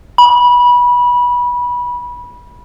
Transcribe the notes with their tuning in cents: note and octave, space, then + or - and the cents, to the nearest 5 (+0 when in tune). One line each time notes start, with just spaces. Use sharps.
B5 -20